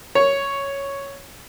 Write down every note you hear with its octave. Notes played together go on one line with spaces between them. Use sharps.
C#5